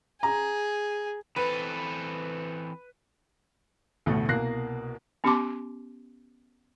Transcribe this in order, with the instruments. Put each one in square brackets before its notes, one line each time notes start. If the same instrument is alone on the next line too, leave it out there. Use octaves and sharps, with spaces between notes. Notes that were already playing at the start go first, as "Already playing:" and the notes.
[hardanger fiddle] G#4 [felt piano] A#5
[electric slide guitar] E3 C4 A4 [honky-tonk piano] B4
[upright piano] A1 D2 B2 E3 A3
C2 B2 A#3 F#6 A#6 C7
[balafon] B3 C#4 G4 A5 C6 D6